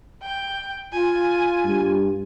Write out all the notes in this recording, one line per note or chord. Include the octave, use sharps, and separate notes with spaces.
G5
F4 G#5
G2